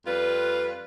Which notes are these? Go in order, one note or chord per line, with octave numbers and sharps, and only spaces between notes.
F2 G3 F4 B4